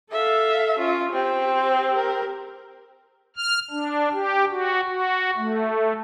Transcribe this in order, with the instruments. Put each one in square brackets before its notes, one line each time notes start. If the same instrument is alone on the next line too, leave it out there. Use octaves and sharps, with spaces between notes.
[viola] A4 F5 [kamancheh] E5
[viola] C#4 F4
[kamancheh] C4 [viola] G4 C5
[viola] G4 A#4
[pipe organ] F6
D4
G4
F#4
F#4
A3